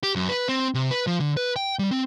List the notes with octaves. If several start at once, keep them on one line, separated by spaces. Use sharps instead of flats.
G4
F#2
B4
C4
C3
B4
F3
D3
B4
G5
G3
C4